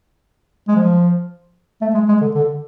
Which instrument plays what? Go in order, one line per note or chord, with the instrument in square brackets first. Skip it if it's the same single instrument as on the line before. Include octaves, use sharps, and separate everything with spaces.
[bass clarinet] G#3
F3
A3
G#3
G#3
D3
D3